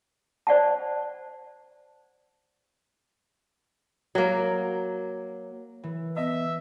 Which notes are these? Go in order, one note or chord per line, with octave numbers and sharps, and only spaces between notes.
C5 D5 F#5 A5
F#3 A#3
E3
B3 D#5 E5